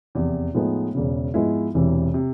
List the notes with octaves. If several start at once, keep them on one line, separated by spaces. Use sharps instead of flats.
F1 E2 C3
A2 F3 G#3 B3 D#4
E1 E2 C#3
G#2 F3 G#3 B3 E4
E1 E2 C3 E3
C3